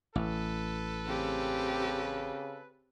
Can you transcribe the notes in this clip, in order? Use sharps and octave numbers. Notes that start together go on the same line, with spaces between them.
A1 A4 B4
C#3 C4 G4